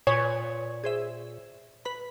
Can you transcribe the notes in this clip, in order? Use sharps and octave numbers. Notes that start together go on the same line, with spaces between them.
A#2 B4 C#5 G#5
G#4 C5 E5
B4 B5